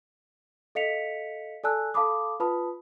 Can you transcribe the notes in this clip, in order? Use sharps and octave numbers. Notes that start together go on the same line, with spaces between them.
A4 D#5 F5 B6 C#7 F7
A4 D5 G#5 A5 E6 F#6
A4 F5 A5 B5 D6 D#6
F4 B4 A5 B5 D#6